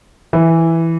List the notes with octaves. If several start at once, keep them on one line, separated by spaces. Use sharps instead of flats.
E3